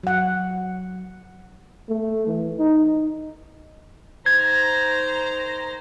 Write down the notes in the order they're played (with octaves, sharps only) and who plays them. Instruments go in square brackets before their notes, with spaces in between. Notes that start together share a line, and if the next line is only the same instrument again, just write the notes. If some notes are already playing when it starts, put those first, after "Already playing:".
[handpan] F#3 F#5
[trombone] A3
E3
D#4
[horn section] D#3 C5 A#5 [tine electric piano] G#6